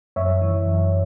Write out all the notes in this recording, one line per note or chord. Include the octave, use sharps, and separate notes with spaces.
F#2 C#5 E5
E3
F#2